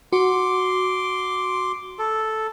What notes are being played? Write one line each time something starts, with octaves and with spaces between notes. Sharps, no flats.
F#4 C6 D6
A4